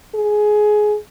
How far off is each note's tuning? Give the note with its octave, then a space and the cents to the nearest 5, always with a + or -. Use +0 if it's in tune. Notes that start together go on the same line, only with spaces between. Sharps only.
G#4 +15